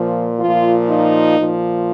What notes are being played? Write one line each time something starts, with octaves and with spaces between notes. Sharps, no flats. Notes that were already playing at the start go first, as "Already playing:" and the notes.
Already playing: A#2 F3
A#2 F3 F4
D#4
A#2 F3